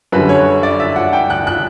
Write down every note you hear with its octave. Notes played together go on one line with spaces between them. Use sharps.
F#2 D3 G3 B4
C#5
D5
E5
F#5
G5
F#6
F#6